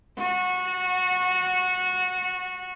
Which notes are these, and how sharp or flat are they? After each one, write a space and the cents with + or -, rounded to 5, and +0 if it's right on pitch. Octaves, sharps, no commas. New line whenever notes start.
F#4 -20